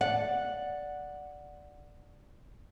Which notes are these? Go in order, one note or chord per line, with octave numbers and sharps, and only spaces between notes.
D5 F#5